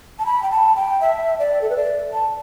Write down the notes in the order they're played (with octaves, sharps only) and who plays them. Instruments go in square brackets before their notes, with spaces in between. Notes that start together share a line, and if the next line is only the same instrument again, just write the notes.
[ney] A5
B5
G5
A5
G5
E5
D5
A4
B4
D5
A5